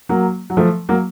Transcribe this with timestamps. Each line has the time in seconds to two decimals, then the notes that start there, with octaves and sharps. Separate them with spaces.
0.09 F#3 A#3
0.50 F#3
0.57 F3 A3
0.89 F#3 A#3